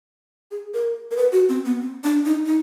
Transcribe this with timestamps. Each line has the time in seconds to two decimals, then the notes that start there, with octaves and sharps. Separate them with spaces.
0.51 G#4
0.74 A#4
1.11 A#4
1.17 B4
1.32 F#4
1.49 C4
1.65 B3
1.81 C4
2.04 D4
2.25 D#4
2.46 D#4